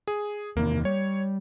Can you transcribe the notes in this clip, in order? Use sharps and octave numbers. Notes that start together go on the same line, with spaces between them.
G#4
E2 C3 D#3 A#3
G3 C#5